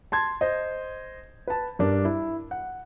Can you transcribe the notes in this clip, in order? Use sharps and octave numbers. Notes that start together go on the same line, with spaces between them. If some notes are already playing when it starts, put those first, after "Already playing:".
A5 C6 G#6
C5 D#5
B4 A5
G2 D4 A#4
E4
F#5